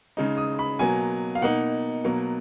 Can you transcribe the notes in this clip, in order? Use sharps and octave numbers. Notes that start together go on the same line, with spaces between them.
C#3 G#3 D#4
D#6
B5
B2 F#3 A#3 G#5
F5
B2 A#3 D#4 F#5
B2 F#3 A#3